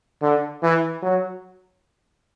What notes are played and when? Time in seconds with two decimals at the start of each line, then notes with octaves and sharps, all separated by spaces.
0.22 D3
0.63 E3
1.03 F#3